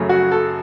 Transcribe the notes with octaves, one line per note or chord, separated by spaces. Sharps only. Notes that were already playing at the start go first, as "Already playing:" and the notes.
Already playing: F#2 C#3 F#3 A3
F#4
A4